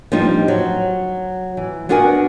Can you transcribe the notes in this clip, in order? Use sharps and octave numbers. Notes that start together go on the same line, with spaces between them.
F3 G3 C4 D4 D#4
F#3
E3
B3 D4 F#4 A#4 F#5 G#5